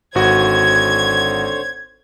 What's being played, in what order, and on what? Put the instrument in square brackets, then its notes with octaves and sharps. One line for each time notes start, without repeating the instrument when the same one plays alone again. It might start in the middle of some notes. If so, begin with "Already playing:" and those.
[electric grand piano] G#1 F#4 [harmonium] D3 C5 C#5 [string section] G#6